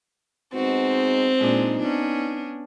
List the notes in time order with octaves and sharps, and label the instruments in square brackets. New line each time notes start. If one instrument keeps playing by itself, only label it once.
[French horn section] G#3 B3 D#4 [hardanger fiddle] C4 [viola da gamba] F#4
[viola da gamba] A#2 G#3 D4 [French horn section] D#4
[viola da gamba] B3 C#4 D4